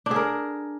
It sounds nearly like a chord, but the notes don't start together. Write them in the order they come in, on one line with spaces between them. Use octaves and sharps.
D4 G#4 A#4